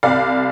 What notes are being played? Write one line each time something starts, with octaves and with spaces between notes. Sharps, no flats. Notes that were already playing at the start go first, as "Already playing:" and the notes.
C2 D5 F5